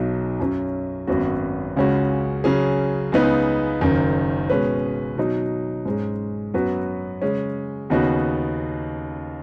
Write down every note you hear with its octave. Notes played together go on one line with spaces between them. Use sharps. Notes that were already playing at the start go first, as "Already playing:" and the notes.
Already playing: B1 B2 F#3 D#4
F#2 F#3 C#4
G#1 F#2 F#3 B3 F#4
C#2 C#3 G#3 C#4 F#4
C#3 F#3 C#4 G#4
C#2 C#3 B3 D#4 B4
F#1 F#2 D#3
B2 G#3 C#4 B4
B2 F#3 D#4
G#2 G#3 C#4
F#2 F#3 B3 F#4 B4
C#3 G#3 C#4
D#2 C#3 B3 D#4 F#4